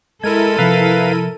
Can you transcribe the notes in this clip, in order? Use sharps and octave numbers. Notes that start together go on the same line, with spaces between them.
G#3 E4 A4 A#4 G#6 D#7
C3 F3 B4 F5